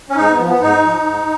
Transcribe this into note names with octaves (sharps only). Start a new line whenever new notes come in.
C#4
G#2 D#4
B3
F3
B3
G#2 D#4
F3
G#2